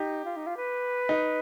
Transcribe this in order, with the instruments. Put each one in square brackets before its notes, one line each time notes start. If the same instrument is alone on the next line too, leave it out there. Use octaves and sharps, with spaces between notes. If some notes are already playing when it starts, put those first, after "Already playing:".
Already playing: [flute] D#4 [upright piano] G4
[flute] F4
D#4
F4
B4
[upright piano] D#4